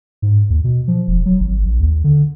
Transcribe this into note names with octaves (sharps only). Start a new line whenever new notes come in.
G#2
D#2
B2
F3
E1
F#3
G#1
A#1
D#2
D3